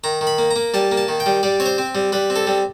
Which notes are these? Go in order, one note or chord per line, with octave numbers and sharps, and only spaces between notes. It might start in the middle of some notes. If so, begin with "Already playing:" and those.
D#3 A#5
D#3
B5
A#3
A#5
A#3
G3 A5
A#3
A5
D#3
G5
G3
G3 D5
C4 C#5
C5
C4
G3
G3 B4
C4
A4
G3